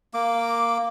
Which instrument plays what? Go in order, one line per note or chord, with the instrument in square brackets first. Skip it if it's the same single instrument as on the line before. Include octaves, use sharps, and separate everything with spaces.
[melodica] A#3 D6